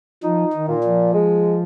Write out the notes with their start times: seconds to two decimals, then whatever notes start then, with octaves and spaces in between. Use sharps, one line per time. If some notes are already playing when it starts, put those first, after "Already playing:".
0.23 F3 D#4
0.53 D#3
0.69 A#2
0.84 F3
1.14 G#3